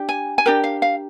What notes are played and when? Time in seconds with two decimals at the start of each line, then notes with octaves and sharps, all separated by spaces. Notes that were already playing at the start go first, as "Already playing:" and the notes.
Already playing: D4 G4
0.09 G#5
0.38 G#5
0.46 D4 G4 A#4 G5
0.64 F5
0.82 F5